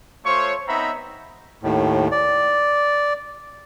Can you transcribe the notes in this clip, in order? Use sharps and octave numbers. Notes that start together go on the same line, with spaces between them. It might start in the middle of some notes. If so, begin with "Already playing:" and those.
A3 F4 C5 C#5
B3 C4 D#4 E5 A#5 B5
D#2 A2
D5